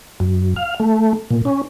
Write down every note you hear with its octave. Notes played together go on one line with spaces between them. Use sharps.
F#2
F5
A3
A#2
C#4